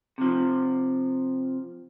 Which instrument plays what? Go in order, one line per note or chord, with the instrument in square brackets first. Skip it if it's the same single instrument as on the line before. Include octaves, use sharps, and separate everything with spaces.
[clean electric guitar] C3 F3